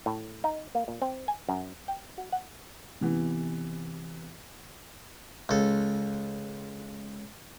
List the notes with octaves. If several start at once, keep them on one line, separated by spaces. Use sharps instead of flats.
A2
D#4
A#3
A#2
C4
G#5
F#2
G5
F#4
F#5
C3 E3 B3
C#2 A4